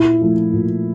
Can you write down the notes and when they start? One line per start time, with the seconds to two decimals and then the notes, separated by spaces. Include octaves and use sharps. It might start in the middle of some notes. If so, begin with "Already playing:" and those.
Already playing: A#2 E4
0.21 F3 A3
0.53 A#2